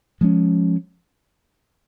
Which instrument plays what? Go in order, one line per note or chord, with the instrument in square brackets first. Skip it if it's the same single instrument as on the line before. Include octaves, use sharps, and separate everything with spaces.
[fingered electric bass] F3 G#3 C#4